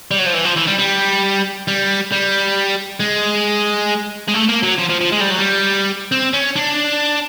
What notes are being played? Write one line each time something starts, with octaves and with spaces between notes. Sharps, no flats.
G3
F#3
F3
E3
F3
E3
G3
G3
G3
G3
G#3
G#3
A3
A#3
F#3
F3
F3
F3
G#3
G3
F#3
G3
C4
C#4
D4